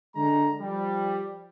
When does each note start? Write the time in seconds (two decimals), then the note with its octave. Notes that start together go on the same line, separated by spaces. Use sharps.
0.15 D3 G#3 A#5
0.60 F3 G3